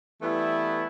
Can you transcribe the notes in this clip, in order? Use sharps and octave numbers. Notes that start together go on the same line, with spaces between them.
E3 G3 A3 B3 E4